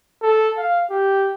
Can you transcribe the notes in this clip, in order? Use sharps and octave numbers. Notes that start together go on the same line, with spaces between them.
A4
F5
G4